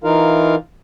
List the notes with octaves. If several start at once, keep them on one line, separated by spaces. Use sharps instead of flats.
E3 D#4 F4 A#4 F5